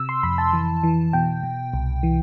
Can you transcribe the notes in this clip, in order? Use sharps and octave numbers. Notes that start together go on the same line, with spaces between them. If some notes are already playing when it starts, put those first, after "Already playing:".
Already playing: C3 E6
C6
F2 B5
A5
E3
E3
B2 G5
B2
C2
E3